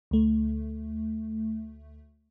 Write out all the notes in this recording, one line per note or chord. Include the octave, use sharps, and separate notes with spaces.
D2 A3